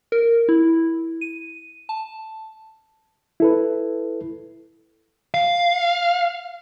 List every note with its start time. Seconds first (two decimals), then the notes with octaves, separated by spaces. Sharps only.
0.12 A#4
0.49 E4
1.21 D#7
1.89 A5
3.40 E4 A4 B4
5.34 F5